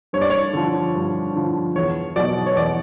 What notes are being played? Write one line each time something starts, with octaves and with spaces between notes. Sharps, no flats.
G2 C#5
D5
C#5
D3 F3
G2
D3 F3
E2 C#5
B2 F#3 D5
C#5
E2 D5